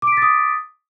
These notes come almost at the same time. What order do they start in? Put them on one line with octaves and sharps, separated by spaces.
D6 D7 B6 A6 D#6